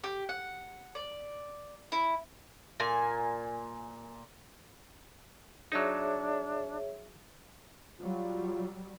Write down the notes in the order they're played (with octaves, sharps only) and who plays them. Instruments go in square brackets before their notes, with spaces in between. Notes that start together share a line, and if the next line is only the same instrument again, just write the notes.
[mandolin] G4
F#5
D5
E4
[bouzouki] A#2 G#5
[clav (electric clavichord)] F#3 D#4 [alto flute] D4 [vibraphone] G#4 C#5 E5
[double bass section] F#3 G3 [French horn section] F4